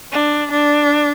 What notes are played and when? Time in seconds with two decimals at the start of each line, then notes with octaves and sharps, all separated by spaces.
0.12 D4
0.52 D4